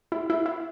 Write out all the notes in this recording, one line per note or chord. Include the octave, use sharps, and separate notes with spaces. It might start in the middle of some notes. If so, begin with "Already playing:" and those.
E4
E4
E4